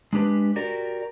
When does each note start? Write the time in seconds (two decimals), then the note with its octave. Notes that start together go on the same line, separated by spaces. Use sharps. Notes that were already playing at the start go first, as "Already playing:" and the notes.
0.13 G#3 D4 G4 B4
0.56 F#4 G4 A#4 D5